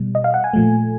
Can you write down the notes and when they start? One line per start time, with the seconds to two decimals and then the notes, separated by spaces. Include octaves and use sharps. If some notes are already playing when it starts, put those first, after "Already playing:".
Already playing: B2 G3
0.15 D#5
0.24 F5
0.34 F#5
0.44 G#5
0.53 A#2 F3 A3